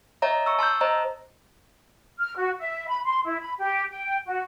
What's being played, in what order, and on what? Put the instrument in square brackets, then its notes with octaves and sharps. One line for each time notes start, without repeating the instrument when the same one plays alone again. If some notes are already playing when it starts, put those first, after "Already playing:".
[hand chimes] C#5 D#5 E5 A#5
C#6 E6
A5 C6 E6 G6
C5 D#5 A#5
[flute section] F6
F#4
E5
B5
C6
E4
B5
G4
G5
F#4